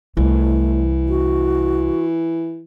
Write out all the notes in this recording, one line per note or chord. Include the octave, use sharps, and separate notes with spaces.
C2 E3 A3
F#4